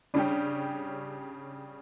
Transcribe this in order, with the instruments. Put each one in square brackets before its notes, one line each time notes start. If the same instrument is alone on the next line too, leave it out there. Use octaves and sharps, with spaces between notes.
[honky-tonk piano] C#3 G3 C#4 G4 [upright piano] D4